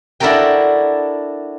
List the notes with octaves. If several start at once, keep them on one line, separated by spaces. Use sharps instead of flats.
D4 E4 F#4 A4 A#4 G5